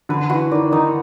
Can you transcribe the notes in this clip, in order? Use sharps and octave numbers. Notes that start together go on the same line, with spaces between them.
D3 B4
E3 F#4
D#3 D5
D#3 D#4